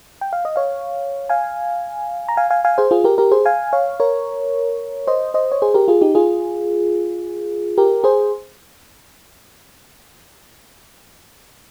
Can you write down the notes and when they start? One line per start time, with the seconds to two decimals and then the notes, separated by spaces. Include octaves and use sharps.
0.21 G5
0.33 F5
0.45 D#5
0.56 C#5 F5
1.29 F5 G#5
2.29 A#5
2.37 F5 G#5
2.50 F5 G#5
2.65 F5 G#5
2.78 G#4 C5
2.91 F4 G#4
3.04 G4 A#4
3.18 G4 A#4
3.31 G#4 C5
3.46 F5 G#5
3.73 C#5 F5
4.00 A#4 C#5
5.07 C5 D#5
5.34 C5 D#5
5.52 C#5
5.62 G#4 C5
5.74 G4 A#4
5.88 F4 G#4
6.01 D#4 G4
6.15 F4 G#4
7.78 G4 A#4
8.04 G#4 C5